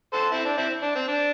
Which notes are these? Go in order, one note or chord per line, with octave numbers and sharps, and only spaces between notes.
A4 C5
C4 E4
D4
C4 E4
D4
C4
D4